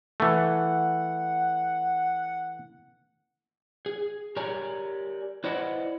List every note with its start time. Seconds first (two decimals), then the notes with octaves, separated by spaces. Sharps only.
0.20 E3 A3 F#5
3.86 G#4
4.36 G4 A#4 C#5 D5 G#5 A#5
5.44 E4 B4 C5 D5 D#5 F#5